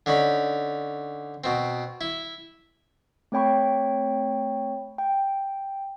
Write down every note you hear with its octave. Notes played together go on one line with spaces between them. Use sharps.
D3 C#4 D#4 B5
B2 C4
E4
A3 C4 C#5 G5 B5 C#6
G5